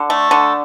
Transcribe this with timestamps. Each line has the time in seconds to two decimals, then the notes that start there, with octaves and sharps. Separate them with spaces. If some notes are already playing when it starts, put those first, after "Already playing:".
Already playing: D3
0.10 A3
0.31 D3